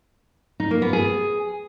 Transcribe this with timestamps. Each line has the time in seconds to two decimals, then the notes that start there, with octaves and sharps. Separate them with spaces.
0.60 D#4
0.71 A#3
0.82 B3
0.93 G#4